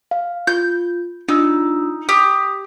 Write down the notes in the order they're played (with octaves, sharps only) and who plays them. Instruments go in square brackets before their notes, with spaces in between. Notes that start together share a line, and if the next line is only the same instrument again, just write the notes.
[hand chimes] F5
[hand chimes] F4 [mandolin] G6
[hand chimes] D4 F4 E6 [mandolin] D#4
[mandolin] G4 [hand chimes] D#6